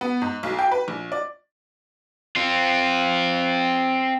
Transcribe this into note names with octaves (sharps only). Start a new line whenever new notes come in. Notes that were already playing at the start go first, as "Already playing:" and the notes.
B3
G#2
B1
G5
B4
A#1
D5
C4 F4